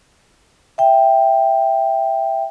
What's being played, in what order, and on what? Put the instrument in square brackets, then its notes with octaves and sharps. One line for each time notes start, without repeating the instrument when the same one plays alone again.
[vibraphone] E5 G5